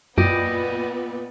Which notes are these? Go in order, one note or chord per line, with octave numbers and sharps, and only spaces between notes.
F#2 A#2 B3 D5 D#5 G5